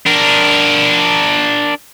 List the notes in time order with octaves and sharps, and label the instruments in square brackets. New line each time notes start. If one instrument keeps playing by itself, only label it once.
[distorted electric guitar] D4 A#4